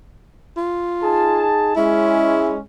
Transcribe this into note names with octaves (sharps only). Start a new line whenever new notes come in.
F4
D#4 G#4 A5
G#3 C#4 E4